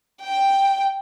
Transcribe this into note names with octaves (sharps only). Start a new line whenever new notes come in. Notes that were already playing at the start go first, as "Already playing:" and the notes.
G5